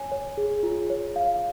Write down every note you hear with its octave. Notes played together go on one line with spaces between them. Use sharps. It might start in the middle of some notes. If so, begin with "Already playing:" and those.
Already playing: C#5 G#5
C#5
G#4
F4
C#5
F5